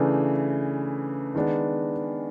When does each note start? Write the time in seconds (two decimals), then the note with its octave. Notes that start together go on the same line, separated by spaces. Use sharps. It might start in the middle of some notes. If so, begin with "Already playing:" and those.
Already playing: C#3 E3 A3 D4
1.35 D#3 G#3 B3 D4